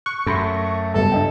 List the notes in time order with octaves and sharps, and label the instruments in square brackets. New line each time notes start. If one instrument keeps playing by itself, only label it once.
[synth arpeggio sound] C#6 [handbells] F#6
[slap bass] F#2 [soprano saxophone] A3 [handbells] A4 B5 C6
[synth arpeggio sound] C#2 G2 B2 [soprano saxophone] A4 [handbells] E5 A5
[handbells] D4 D#5 G5